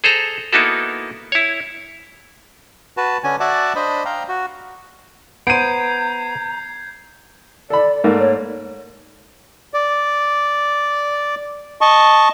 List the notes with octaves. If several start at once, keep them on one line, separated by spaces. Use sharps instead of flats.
G#4 A4 C5 A#5
A#3 B3 D#4 E4 F#4 A4
E4 C#5
F#4 B4 A5
D3 C#4 D4 G#5
F#4 D5 E5 F#5 A5 D6
D4 C5 D#5 B5
F5 G5 A#5
F#4
B3 C5 A#5 G6 G#6 C7 D7 D#7
A4 D5 B5
G#2 A3 A#3
C#5
D5
D#5 A5 C#6